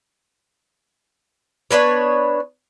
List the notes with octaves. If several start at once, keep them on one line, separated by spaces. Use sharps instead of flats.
B3 D4 B4 C#5